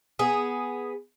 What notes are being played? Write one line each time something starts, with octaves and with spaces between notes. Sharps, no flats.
B3 G#4